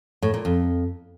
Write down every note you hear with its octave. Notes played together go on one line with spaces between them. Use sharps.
A2
A#2
F2